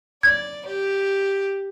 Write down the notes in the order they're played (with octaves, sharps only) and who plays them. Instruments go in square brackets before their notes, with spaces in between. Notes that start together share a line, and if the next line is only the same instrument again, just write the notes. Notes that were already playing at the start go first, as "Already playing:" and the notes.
[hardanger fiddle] D5 [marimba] G#6
[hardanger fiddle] G4